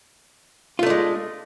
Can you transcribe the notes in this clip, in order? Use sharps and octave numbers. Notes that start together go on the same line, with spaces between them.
G#3 A3 D4 F4